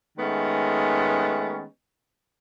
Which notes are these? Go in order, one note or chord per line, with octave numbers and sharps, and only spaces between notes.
D#3 G#3 A3 B3 C#4